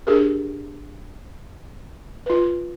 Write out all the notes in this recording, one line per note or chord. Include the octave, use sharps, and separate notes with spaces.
D4 G4 G#4 A#4
F4 B4